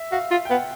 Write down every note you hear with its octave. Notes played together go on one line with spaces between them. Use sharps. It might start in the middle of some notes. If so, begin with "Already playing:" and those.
Already playing: E5
F#4 F5
F4
G5
B3 F#5